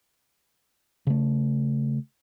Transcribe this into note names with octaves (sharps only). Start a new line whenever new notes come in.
C#3 A3